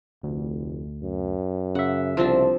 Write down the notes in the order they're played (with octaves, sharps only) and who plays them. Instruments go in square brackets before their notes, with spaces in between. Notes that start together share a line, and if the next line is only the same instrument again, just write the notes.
[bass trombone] F1 [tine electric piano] D2
[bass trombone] F#2
[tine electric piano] C#3 E5 [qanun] F#5
[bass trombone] C2 [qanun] F3 C4 D4